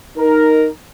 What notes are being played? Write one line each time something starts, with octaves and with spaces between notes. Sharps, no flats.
D#4 A#4